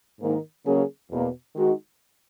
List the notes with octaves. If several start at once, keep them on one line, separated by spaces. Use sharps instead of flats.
G#2 D#3 A#3 D#4
C#3 F#3 A#3 C#4 G#4
E2 B2 A#3
D#3 G#3 D#4 F#4